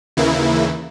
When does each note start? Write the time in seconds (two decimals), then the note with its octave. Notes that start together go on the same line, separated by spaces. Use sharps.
0.17 D#2 C#3 E3 A#3 E4